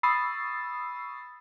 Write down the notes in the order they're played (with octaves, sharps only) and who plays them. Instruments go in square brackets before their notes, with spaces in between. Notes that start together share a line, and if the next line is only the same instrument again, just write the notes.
[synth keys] B5 C#6 D#6 E6 A6 C7